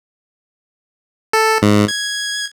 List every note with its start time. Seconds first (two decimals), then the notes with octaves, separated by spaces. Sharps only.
1.33 A4
1.62 G#2
1.88 G#6